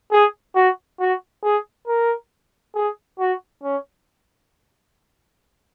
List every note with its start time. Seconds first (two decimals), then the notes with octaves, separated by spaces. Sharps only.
0.12 G#4
0.56 F#4
1.00 F#4
1.44 G#4
1.88 A#4
2.75 G#4
3.20 F#4
3.64 C#4